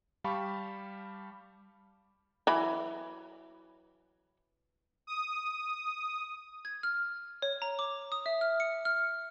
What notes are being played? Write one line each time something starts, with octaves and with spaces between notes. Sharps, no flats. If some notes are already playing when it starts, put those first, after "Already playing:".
G3 G4 F5 A5 B5 C#6
E3 F#3 B5
D#6
G#6
F6
C#5
A#5
D6
D#6
E5
F6
C#7
F6